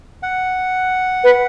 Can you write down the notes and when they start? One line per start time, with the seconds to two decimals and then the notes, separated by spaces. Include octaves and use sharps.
0.23 F#5
1.24 B4